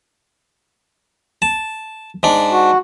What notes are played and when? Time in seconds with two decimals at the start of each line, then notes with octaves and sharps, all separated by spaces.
1.42 A5
2.23 G#2 D4
2.52 F#4